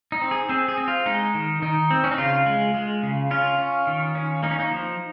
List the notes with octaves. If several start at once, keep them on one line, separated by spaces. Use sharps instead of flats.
D#4
C4
G#4
C4 G#4
G#4
C4
F4
G#3 D#4
D#3
D#3 D#4
C4
C#4
D#4
C#3 F4
G#3
G#3
C#3
C#4 F4
C#4
D#3
C#4
A#3 D#4
C#4
D#4
F3